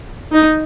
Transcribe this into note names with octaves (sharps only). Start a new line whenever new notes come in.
D#4